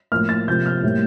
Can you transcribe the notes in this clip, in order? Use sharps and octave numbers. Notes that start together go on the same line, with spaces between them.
A2 F3 A#3 F6
A6
C3 F3 A#3 G6
F6
A2 G3 A#3